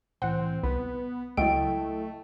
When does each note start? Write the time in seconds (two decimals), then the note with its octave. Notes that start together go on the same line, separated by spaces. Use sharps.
0.22 C2 A2 E3 C4 F#5
0.63 C2 B3 B4
1.37 C#2 F#3 A3 E4 D#5 G5